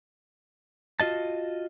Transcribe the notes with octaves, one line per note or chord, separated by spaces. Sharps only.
F4 F#4 D#5 A5